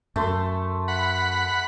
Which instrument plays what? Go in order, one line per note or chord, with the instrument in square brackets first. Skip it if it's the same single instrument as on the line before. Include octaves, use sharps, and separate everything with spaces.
[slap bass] F#2 [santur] A3 C6
[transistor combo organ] F#5 B5